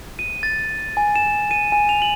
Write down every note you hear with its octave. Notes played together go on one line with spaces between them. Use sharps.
D#7
A6
G#5
E7
D#7
G#5
F7
F#7